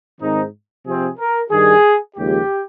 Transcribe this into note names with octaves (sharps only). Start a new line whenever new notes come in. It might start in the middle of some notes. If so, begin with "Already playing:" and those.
G#2 D#3 G#3 C4 D#4
C3 F3 C4 G#4
A#4
G2 D#3 G3 G#4
D#2 C#3 F3 G#3 G4